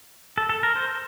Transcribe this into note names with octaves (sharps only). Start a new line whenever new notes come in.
A4
A4
A#4
C5